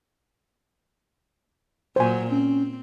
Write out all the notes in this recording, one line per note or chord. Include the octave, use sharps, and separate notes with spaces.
A#2 F#3 C5 G#5
C4 C#4